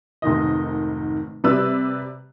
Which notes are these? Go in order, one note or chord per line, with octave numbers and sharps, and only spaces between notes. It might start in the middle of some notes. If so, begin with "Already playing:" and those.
F1 G#2 D#3 D#5
C3 G3 B4 D5 E6